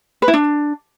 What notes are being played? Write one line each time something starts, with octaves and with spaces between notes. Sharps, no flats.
B4
E4
D4